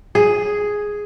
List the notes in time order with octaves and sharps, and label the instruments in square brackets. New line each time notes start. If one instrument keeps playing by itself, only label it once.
[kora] G#4